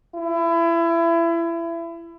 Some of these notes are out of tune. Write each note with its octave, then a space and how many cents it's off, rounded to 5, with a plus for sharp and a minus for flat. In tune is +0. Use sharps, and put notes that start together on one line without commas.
E4 +30